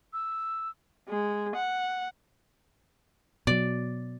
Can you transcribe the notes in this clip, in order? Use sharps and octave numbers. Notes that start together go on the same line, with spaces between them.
E6
G#3
F#5
B2 F#3 D5